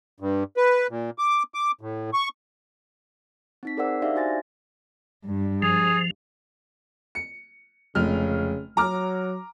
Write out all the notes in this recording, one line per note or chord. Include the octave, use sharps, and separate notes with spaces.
G2
B4
A#2
D6
D6
A2
C#6
C4 D#4 B6
G#4 A#4 C5 D5 F#5 E6
D4 D#4 G4 D5 E5 F5
F#4 C5 G#5 A6 A#6
G2
F3 G#4
C#7
F1 C#3 G#3 F6
F#3 A#5 D6 F6